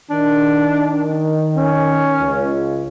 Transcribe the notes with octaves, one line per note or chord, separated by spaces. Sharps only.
D#3 D4
C#4
C#2